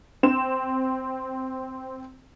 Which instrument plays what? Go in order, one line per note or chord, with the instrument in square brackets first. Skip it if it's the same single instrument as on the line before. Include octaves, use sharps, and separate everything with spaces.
[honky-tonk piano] C4 E7